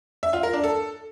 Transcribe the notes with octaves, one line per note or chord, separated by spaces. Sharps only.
E5
F4
A#4
D4
A4